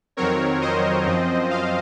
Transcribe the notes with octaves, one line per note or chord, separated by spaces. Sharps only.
F2 D#3 F#3 C4 A#4 C#5
C5 D#5
F#2 F3 C4
F5